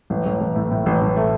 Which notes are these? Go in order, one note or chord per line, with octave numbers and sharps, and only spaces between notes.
A1
A1
A1
A2
A2
A1
A1
A3